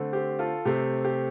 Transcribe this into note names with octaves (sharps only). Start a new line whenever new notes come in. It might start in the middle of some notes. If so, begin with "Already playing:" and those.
Already playing: D3 A3 C4
G4 C5
F4 A4
C3 A3 C4 G4
G4